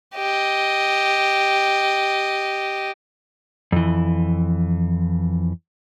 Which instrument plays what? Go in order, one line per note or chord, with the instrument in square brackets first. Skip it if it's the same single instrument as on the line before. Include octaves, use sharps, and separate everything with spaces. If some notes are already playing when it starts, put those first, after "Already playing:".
[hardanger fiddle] G4 D#5
[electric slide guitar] F2 E3